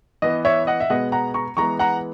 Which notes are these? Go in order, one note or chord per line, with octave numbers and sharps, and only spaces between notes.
E3 B3 D#5
C#5 E5
D#5 F#5
E5
B2 G#3 B3 D#5 F#5
F#5 A#5
A#5 C#6
E3 G#3 B3 A#5 C#6
F#5 A#5